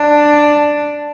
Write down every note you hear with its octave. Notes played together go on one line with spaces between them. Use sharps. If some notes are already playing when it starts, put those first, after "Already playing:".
Already playing: D4